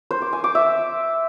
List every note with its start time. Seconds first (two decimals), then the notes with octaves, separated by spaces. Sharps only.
0.11 C5
0.22 D6
0.33 G#5
0.44 D6
0.55 E5